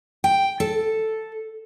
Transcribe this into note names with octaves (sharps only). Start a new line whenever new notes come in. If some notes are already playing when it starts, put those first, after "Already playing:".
G5
A4